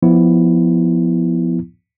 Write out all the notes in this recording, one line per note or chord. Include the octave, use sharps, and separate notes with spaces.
F3 B3 E4